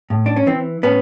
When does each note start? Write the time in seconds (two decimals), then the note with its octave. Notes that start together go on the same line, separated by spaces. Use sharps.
0.10 A2
0.26 D4
0.36 C#4
0.47 E3 C4
0.83 A2 B3 C#4